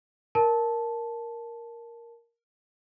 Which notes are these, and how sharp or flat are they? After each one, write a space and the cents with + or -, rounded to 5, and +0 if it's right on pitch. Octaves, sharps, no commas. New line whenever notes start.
A#4 +0 A5 -5